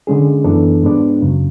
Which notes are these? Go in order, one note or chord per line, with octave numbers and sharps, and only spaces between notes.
D3 G#3 C#4 G#4
F#2 E3 B3 D4 A4
G#2 G#3 B3 D4
F#2 C#3 F#3